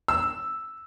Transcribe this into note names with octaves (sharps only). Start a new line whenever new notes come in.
E6